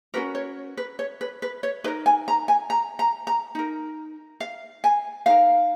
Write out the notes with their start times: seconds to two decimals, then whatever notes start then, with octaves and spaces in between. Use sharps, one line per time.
0.14 C#4 F#4 A#4 B4
0.35 C#5
0.77 B4
0.99 C#5
1.21 B4
1.42 B4
1.63 C#5
1.84 D#4 A#4 B4
2.06 G#5
2.28 A#5
2.48 G#5
2.70 A#5
2.99 A#5
3.27 A#5
3.55 D#4 A#4
4.40 F5
4.84 G#5
5.26 D#4 A#4 F5